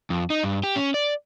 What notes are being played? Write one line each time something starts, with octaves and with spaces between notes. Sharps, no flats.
F2
D#4
G2
G4
C#4
D5